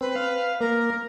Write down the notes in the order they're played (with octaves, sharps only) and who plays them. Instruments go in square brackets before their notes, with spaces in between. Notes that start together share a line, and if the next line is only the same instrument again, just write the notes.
[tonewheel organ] C4 [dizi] B4
[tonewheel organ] F5
[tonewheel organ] A#3 [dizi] A#4